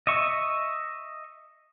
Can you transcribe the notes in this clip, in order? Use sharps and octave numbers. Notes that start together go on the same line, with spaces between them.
D#5 E5 C#6